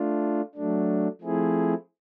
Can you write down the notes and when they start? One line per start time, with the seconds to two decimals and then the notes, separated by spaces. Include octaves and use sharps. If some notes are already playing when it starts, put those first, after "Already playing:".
Already playing: A3 D4 F4
0.55 F#3 A3 D4
1.21 F3 A3 C4 E4 G#4